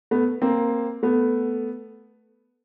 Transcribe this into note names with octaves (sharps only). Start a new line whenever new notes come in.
A3 B3
A#3 C4
A3 B3